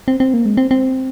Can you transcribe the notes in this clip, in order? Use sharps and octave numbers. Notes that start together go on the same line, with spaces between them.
C4
C4
A#3
G#3
C4
C4